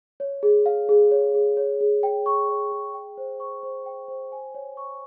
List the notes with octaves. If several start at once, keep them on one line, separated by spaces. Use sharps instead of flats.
C#5
G#4
F5
G#4
C#5
G#4
C#5
G#4
G5
C#6
C#5
G#4
G5
C5
C#6
C5
G5
C5
G#5
C#5
C#6